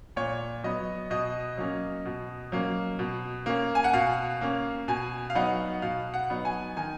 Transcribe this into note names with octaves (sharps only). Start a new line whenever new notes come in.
A#2 C#5
F#3 B3 D#5
B2 D#5
F#3 A#3 C#4
B2
F#3 A#3 C#4
B2
A#3 C#4
G#5
F#5
B2 F5
A#3 C#4
B2 G#5
F5
F#3 B3 D#4 F#5
B2 F5
F#5
F#3 B3 D#4
G#5
D#3 G#5